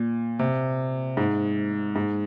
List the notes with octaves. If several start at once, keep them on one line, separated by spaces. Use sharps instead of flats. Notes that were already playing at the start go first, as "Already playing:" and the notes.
Already playing: A#2
C3
G#2
G#2